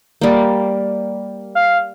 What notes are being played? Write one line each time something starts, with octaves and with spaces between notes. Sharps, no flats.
G3 A#3
F5